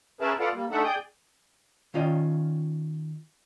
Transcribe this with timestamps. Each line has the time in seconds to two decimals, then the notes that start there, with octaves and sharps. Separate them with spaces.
0.21 C#4 G#4 A#4 B4 E5 A5
0.39 F4 A4 B4 D5 F5 F#5
0.54 G3 A#3
0.71 A3 D4 D#4 A4 E5 F#5
0.84 G#4 D5 G5 D#6 G6
1.94 D#3 C#4 F4 D5 D#5